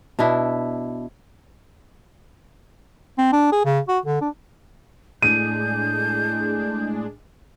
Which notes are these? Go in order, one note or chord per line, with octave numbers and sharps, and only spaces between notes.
B2 D4 E4
C4
D4
G#4
C#3
F#4
D3
D4
A2 G#3 D4 G#4 G6 D#7